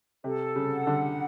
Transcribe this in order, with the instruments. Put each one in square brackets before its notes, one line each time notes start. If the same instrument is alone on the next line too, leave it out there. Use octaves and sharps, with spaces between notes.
[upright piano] C3 [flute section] A4
[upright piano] C#3
[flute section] F#5
[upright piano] D3